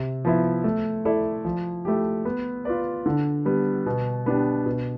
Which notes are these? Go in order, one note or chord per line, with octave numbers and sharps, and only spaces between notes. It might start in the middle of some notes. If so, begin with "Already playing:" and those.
Already playing: C3
F3 B3 E4
A3
E4 A4 D5
F3
A3 E4 G4
B3
F4 B4 D5
D3
G3 B3
B2
B3 D4 G4
B2